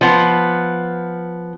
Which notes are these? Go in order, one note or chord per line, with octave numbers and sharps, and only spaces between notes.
F3 B3